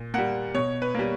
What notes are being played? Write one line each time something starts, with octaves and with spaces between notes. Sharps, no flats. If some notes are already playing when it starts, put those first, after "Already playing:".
Already playing: A#2
G3 A#3 F#5
B2 C#5
B4
G3 A#3